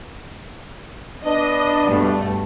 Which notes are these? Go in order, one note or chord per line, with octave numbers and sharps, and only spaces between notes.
B3 D4 D#5
G2 B2 A3